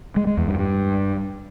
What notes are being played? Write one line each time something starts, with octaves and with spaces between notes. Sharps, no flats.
G#3
G#3
E2
G2
G2